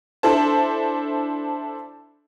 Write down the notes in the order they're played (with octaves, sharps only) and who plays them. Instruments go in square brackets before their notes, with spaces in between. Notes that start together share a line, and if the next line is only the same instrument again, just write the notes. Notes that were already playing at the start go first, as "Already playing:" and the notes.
[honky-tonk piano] D4 E4 A4 C5 A5